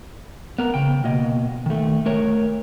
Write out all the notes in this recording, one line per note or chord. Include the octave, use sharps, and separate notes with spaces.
B3 A#4
C#3 G5
B2 A#3 D#5
D#3 A3
A3 A#4 C#5